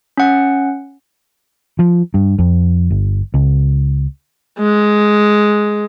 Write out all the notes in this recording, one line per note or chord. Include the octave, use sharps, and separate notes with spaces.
C#4 F#5
F3
G2
F2
G1
C#2
G#3